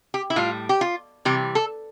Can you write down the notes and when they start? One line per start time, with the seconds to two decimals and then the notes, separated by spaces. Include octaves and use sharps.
0.14 G4
0.30 E4
0.36 A2 G3 F4
0.69 G4
0.81 F4
1.25 C3 E3 G3 G4
1.55 A4